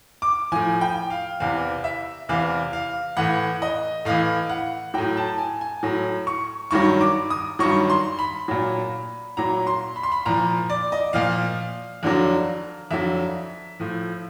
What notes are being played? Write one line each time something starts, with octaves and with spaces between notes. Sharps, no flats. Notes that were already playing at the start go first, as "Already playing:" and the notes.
D6
A2 F3 G#5
G5
F5
E2 C3 E3 F5
E5
E2 C3 E3 F5
F5
A2 E3 F#5
D#5
A2 E3 F5
F#5
A2 F#3 G5
A5
G#5
G#5
A2 F#3
C#6
G2 D#3 F#3 C#6
D6
D#6
G2 D#3 F#3 C#6
C6
B5
A#2 F#3
A#2 F#3 A#5
C6
B5
C6
B5
A#2 F3 A#5
D5
D#5
A#2 F3 F5
F2 D3 F#3
F2 D3 F#3 E5
A2 F3